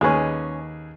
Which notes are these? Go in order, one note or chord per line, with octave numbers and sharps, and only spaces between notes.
D#2 G#3 C#4 G#4 B4